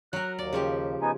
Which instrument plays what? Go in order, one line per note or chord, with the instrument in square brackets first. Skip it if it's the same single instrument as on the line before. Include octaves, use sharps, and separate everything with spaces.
[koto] F#3 A#4 [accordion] F#6
[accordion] D#2 [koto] D5
[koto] C#3 F3 G4
[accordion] B3 D#4 G#5